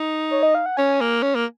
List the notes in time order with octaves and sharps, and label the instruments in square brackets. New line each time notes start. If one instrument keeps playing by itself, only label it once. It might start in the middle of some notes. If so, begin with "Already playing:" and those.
Already playing: [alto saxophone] D#4
[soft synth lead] C#5
D#5
F5
F#5
[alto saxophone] C#4 [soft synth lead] G#5
[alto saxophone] A#3
C#4
A#3